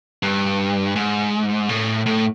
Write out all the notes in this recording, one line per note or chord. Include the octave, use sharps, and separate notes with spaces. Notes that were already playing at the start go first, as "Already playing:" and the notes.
G2
G#2
A2
A2